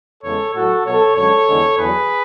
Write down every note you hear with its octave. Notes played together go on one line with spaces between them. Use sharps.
E2 C#3 G#3 A4 C#5
A2 F#3 F#4 A4
B2 F#3 A4 C#5
F#2 D3 G#3 A4 C#5
E2 D3 G#3
E2 D3 F#3 G#4 B4